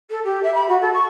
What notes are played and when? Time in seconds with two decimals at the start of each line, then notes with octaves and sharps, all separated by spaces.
0.10 A4
0.24 G4
0.43 E5
0.54 B5
0.68 F#4
0.81 A4
0.93 C#6